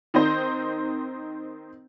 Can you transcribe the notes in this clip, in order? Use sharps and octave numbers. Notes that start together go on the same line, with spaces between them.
D#3 C4 D#4 C5